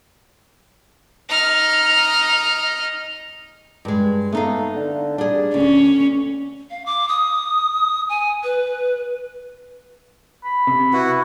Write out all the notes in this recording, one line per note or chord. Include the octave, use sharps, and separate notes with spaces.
D#4 F6
G2 G#3
A3 B3 D#4 F5
D3
G3 D4 G#4
D2 C#4
F5
D6
D#6
G#5
B4
B5
C3
E4 F#4 B4 F#5